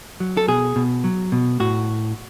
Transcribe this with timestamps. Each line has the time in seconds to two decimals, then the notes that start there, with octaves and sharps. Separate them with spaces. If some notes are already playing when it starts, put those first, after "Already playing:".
0.20 F#3
0.37 A4
0.48 B2 G#4
0.76 B2
1.04 F#3
1.32 B2
1.60 A2 F#4